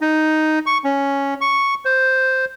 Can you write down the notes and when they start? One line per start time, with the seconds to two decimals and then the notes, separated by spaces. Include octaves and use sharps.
0.01 D#4
0.66 C#6
0.84 C#4
1.41 C#6
1.85 C5